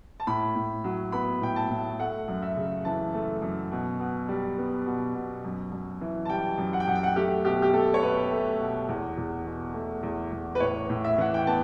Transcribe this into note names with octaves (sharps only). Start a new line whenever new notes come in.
A5
A2 B5
A2
F#3
B3 B5
A2 G5
A5
A2
A3 F#5
F#2
E5
C#3
E3 A5
A3
F#2
B2
B2
G3
B3
B2
B2
F#2
F#2
E3
A5
G3 G5
F#2
F#5
G5
F#2 F#5
G5
F#5
A3 G4
B2 G4
G4
A3 A4
C#5
B2 B4
A3
B2
E2
E2
B2
A3
E2
E2
B4
A2 C#5
A2
E5
E3 F#5
G5
B3 A5